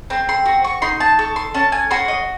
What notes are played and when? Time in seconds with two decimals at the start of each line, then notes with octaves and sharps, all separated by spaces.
0.10 C4 C6
0.29 C6
0.46 F#4 C6
0.64 C#6
0.82 D#4 C6
1.00 A5
1.19 A4 C#6
1.36 C6
1.54 C#4 A5
1.72 G#5
1.91 F#4 C6
2.08 D#5